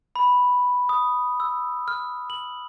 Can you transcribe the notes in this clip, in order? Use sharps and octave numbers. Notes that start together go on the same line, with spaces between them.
B5
D#6
E6
F6
F#7